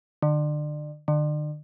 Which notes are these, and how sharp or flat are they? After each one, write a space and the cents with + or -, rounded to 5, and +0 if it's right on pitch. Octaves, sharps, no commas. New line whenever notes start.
D3 +35
D3 +40